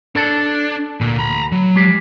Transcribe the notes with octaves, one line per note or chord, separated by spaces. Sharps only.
D4 A4 C#5 A5
D2 A#2
A#5 B5
F#3
G#3 G4